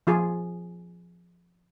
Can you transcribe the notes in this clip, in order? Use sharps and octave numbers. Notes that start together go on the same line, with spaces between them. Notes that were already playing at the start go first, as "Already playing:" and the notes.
F3 F4 G#4